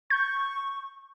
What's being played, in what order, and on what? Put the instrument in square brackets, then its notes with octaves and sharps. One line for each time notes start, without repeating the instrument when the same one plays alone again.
[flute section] C#6 [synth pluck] G6